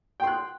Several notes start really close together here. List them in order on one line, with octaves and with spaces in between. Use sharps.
G5 C6 F#6